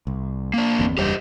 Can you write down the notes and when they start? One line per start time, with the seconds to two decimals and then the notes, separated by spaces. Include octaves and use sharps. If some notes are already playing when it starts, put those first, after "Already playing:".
0.07 C2
0.54 A#3 D4
0.79 G1 E2 C4
0.98 F#1 E2 G3 G4 C5 D#5